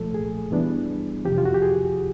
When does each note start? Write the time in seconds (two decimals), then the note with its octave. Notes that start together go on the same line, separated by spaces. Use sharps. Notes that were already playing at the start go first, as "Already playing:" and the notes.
Already playing: C2 A#2 F3 A3 A4
0.14 G#4
0.51 G2 E3 G3 B3 D4
1.25 F2 C3 F3 G4
1.38 F4
1.46 F#4
1.54 G4
1.62 G#4